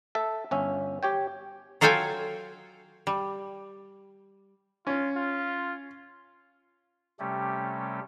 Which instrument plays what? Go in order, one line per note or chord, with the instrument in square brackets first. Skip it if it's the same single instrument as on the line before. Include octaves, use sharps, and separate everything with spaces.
[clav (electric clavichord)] A4 E5
G1 C#4 E5
G4 C#5 G5
[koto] F#3 F4 A4 C5 G5 G#5
G3
[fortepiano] C#4 [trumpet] F4
[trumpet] F4
[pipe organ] C3 G3 A3 C#4 G4